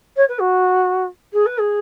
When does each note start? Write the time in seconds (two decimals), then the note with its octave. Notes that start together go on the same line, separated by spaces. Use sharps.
0.16 C#5
0.28 B4
0.39 F#4
1.33 G#4
1.46 B4
1.60 G#4